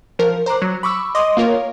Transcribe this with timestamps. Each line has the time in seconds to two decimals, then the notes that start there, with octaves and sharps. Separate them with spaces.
0.19 F3 A#4
0.46 C5 A#5 D6 F#6
0.62 F#3
0.83 B5 C#6 D6 E6
1.15 D#5 C6 D6 D#6
1.37 A#3 F4 A#4 C#5